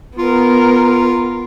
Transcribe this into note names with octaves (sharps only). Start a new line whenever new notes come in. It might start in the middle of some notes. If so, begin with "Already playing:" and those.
B3 F4 A#4